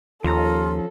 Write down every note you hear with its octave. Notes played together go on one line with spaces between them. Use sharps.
D#2 F3 C#4 F4 A4 A#5